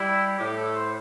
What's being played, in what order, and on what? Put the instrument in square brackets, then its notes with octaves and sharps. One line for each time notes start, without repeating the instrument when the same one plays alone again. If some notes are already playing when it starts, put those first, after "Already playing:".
Already playing: [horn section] G3 [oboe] E4
[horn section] A2 [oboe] G4
[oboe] A4
C5